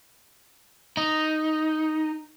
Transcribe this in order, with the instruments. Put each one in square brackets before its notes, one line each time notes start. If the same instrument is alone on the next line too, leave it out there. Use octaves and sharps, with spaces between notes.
[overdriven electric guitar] D#4